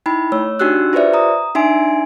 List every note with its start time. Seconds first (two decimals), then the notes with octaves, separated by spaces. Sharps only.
0.06 D#4 E4 G5 B5
0.32 A3 C#5 E6
0.59 D4 D#4 F#4 G4 E6 F#6
0.93 F4 G4 B4 C5 D5 E5
1.14 A#5 D#6
1.55 D4 D#4 E5 G#5 C6 D7